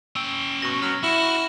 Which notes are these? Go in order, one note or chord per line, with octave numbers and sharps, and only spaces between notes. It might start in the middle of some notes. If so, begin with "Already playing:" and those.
C#4 G5 E6
B2 C#6 A#6
F#3 F6
E4 F#4